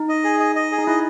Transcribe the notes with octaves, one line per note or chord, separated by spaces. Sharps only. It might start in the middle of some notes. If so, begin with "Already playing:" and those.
Already playing: D#4
D#5
G#4
D#5
D#5
G#4
D#4
E4 D#5